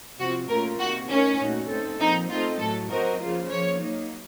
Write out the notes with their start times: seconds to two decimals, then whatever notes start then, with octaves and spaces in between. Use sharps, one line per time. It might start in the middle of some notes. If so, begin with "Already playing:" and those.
0.19 C3 F3 C4 F#4
0.49 A#2 A3 C#4 F4 A#4
0.80 C3 D#3 A#3 F#4
1.09 A3 C#4 D#4 A#4 C#5
1.40 A#2 A3 D#4 F#4
1.70 A3 C4 D#4 A4
2.00 A#2 F3 C4 D#4
2.30 A3 C4 D#4 F4 A4 D#5
2.60 A2 F#3 A3 A4
2.90 F#3 C4 F#4 A#4 C5 D#5
3.21 C#3 F3 A#3 F4 C5
3.49 F3 A#3 C#4 C#5
3.81 F#3 A#3 D#4